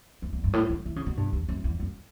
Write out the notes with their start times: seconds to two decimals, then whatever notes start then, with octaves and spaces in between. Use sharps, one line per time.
0.22 E2
0.33 E2
0.44 G2
0.53 A2
0.69 D3
0.85 E3
0.96 C#3
1.06 B2
1.17 G2
1.33 E2
1.49 F#2
1.64 E2
1.79 F#2